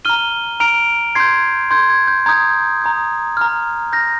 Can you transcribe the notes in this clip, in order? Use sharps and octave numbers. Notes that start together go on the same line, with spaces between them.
A#5 F6 D#7 G7
A#5 F6 D7 F7
C6 G6 G#6 C7
C6 G6 G#6
G#6
G6
A#5 D#6 G6 G#6
A#5 D#6 G6
A#5 F6
A#5 F6 G6 A#6